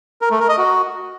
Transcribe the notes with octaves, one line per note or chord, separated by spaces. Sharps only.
A#4
A3
A#4
D#5
F#4